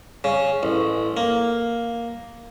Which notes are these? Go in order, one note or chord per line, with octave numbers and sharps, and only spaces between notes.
C#3
A1
A#3